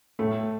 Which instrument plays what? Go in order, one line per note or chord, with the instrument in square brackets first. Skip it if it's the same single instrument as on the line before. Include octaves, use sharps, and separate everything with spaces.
[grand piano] A2 [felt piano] A3